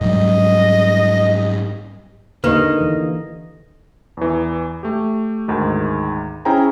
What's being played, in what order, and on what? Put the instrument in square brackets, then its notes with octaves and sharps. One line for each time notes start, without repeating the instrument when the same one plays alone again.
[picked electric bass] G#2 F#3 G3 [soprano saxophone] D#5
[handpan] D3 D#5 [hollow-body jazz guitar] A#3 D#4 [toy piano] G4 B4
[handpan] E3
[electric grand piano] E2 E3
A3 G4
D2 G#2 D#3
C#4 E4 G#4 C5 G5 A#5